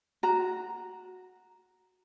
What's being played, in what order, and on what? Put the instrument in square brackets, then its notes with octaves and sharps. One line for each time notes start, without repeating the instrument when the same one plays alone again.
[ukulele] F#4 A#5